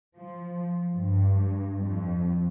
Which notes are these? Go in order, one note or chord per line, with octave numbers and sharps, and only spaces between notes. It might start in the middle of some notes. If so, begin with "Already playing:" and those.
F3
G2
F2